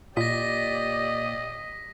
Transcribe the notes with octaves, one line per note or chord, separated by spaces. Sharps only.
A#2 G4 D5 D#5 A#6 B6